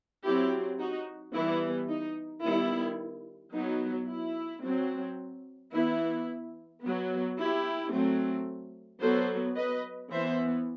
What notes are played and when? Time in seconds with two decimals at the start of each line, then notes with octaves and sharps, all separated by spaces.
0.24 F#3 C4 E4 G4
0.79 D#4 F#4
1.34 E3 G3 B3 E4
1.89 D#4
2.43 D#3 G3 B3 E4
3.53 F#3 B3 D#4
4.08 E4
4.63 F#3 C4
5.72 E3 B3 E4
6.82 F#3 B3
7.37 E4 G4
7.92 F#3 A3 C4
9.01 F#3 B3 A4 C5
9.56 B4 D#5
10.11 E3 B3 C5 E5